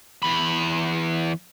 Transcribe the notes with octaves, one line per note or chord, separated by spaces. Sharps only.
E2 B5